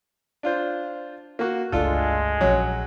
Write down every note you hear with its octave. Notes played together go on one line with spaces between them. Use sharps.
D4 F4 C5
A#3 F#4
G1 C#2 G#3 A3 D4 F4 A4
A#1 F3 F#3 C#4